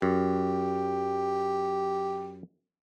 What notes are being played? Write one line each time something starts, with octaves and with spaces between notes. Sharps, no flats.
F#2 G4